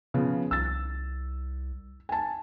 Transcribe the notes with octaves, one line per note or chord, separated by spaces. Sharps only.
C#3 F3 B3
C2 E6 A6
G#5 A5